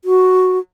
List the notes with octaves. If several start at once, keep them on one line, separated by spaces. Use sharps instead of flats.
F#4